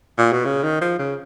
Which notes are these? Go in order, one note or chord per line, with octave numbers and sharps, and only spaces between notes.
A#2
B2
C#3
D#3
F3
C#3